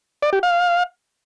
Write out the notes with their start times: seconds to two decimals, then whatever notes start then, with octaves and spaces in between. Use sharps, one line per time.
0.22 D5
0.33 G4
0.43 F5